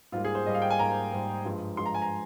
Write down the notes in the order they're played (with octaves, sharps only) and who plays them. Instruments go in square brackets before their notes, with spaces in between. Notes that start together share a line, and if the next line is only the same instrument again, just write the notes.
[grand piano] G#2 G3 A#3 F4
G#4
C5
G#2 G3 A#3 D#5
F5
G5
G#5
G#2 G3 A#3 A#5
G#2 G3 A#3
G2 F3 G#3
G2 F3 G#3 C6
A#5
G#5
A#5